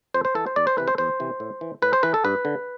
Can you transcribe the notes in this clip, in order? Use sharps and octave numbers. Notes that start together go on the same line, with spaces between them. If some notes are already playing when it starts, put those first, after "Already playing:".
F2 C5
C5
E3 A4
C5
E2 D5
C5
C3 E3 B4
C5
E2 C5
C3 E3
A2
E3
A2 B4
C5
E3 B4
A4
G2 B4
D3